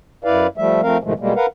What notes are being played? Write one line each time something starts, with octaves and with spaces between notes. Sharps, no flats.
F#2 E4 B4 D5 F5
F3 G3 A3 E5
F3 A3 C4 A#4 F5
G#2 B2 D#3 F3 G#3 A3
B2 G3 G#3 A#3
A#4 B4 F5 F#5